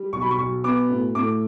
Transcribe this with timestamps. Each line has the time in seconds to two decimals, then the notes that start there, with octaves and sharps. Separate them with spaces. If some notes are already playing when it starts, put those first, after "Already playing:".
Already playing: G3
0.13 B1 C#6
0.22 B5
0.31 C#6
0.38 B1
0.64 B3 D6
0.89 A2
1.15 A2 D6